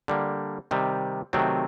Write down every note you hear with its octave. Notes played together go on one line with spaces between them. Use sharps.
D3 G3 A#3
C3 D#3 G3
C3 D#3 F#3 A3 C4